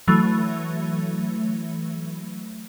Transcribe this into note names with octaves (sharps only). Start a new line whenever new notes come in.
E3 F#3 A3